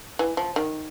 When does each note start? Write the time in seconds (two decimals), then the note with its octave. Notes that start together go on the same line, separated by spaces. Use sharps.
0.19 E3
0.37 F3
0.56 D#3